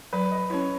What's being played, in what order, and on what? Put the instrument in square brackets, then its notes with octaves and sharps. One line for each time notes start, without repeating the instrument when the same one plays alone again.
[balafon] F#3 [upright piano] B4
[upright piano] D#5
[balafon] C#4 E4 [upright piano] C#5